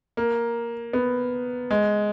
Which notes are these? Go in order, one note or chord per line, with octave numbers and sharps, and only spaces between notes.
A#3
B3
G#3